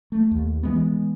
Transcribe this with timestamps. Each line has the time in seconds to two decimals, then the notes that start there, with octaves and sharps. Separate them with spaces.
0.12 A3
0.31 D#2
0.63 E3 G#3 B3